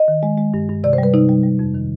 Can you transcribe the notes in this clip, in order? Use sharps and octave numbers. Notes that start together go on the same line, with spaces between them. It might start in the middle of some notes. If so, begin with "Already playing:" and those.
Already playing: D#5
D#3
G#3
G#3
G2
G2
C3 D5
C5
G3
B4
C3 D#4
G3
G3
F2
D#3